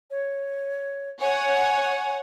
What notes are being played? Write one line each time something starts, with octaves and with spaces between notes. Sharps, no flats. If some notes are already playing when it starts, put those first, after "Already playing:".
C#5
C#5 F#5 G#5